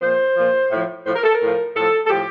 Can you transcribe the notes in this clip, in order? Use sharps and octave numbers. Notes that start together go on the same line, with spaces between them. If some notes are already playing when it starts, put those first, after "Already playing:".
A#2 F3 C5
A#2 F3
A2 F3
A2 F3 C5
A#4
A4
A#4
A2 F3
A2 F3 A4
A4
A2 F3 G4